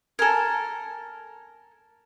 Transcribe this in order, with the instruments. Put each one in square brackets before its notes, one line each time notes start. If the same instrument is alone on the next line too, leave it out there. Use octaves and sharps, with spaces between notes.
[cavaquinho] A4 A#4 [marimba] G#5 A#5 G#6